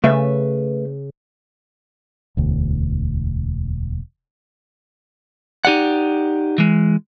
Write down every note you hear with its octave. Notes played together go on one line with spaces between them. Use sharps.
C#3 A3 B4 E5
E1 D2
D#4 G4 D5 F#5
E3 G#3